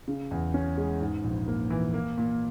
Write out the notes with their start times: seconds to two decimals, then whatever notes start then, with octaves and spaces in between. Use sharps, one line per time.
0.08 C#3
0.31 E2
0.54 C#4
0.78 G#3
1.00 G#2
1.23 A#1
1.48 A#3
1.70 E3
1.94 A#3
2.18 A#2